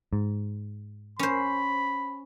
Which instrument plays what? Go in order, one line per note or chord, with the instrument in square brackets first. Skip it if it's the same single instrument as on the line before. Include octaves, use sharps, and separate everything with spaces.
[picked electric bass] G#2
[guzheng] C#4 C5 [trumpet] B5